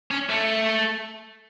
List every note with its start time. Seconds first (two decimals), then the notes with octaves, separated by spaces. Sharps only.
0.11 C#4
0.30 A3